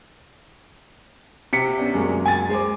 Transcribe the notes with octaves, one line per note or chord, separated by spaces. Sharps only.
C3 B6 C#7
B3 C#4 D4
F#2 G#3 A#3
G#5 A6
G#3 C5 D6